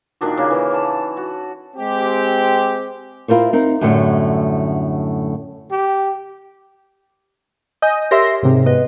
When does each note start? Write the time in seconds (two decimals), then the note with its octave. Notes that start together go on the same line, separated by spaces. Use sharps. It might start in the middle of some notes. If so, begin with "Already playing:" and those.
0.21 A#2 D#3 D4 F#4
0.37 C#3 A#3
0.50 E3
0.71 D5 A5
1.17 F#4
1.76 G#3 C4 G4
3.28 E4 F4 A#4 C5 C#5
3.53 C4 D#4 A#4
3.81 F#2 A2 D3 G3 A3 C#5
5.71 G4
7.82 D#5 G#5 G6
8.11 G4 A#4 C#5 E5 C6 A#6
8.43 G#2 C3
8.66 B3 B4 D#5